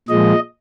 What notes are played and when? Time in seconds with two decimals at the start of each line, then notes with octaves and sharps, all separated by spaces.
0.08 A#2 F3 G#3 D#5